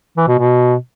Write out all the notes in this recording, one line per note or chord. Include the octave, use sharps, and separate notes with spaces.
E3
B2
B2